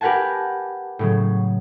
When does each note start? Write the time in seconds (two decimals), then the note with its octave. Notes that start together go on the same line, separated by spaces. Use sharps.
0.01 G4 A#4 B4 F#5 G#5 A5
0.99 A2 C#3 F#3